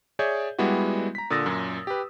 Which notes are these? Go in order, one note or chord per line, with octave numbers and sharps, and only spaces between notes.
G#4 C#5 D5 E5 G6 G#6
G3 G#3 B3 E4 F#4
A#5 B6
A#2 D3 D#6 E6 A6 A#6
F#2 A#2
G4 B4